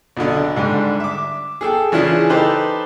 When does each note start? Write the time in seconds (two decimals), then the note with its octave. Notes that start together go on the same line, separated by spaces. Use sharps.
0.17 B1 B2 D3
0.56 G#2 D3 G3
1.00 E5 D6
1.61 G#4 A4 G5
1.92 C#3 E3 D4 E4 F4 G#4
2.30 D#4 G4 A4 B4 C5